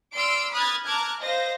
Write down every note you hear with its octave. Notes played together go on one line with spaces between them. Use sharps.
D5 C6 E6 F6 D7
B5 D#6 F6 F#6 G#6 A6
A5 A#5 D6 F6 F#6 G#6
C5 D#5 F5 A#6